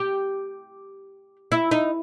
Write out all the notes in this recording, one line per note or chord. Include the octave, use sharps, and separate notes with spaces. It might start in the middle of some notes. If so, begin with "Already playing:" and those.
Already playing: G4
E4
D#4